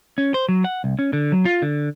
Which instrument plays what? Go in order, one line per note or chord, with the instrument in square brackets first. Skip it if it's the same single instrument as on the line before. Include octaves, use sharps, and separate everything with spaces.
[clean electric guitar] C#4
C5
F#3
F#5
C2
C#4
D3
F#3
F4
D3